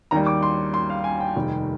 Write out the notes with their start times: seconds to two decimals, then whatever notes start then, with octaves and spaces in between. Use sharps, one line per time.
0.11 D#2 D#3 G3 A#5
0.26 D6
0.43 C6
0.74 C6
0.90 F5
1.04 G#5
1.20 G5
1.36 F1 D#2 D#3 G3